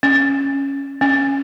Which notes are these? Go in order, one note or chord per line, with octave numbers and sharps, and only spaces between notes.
C#4
C#4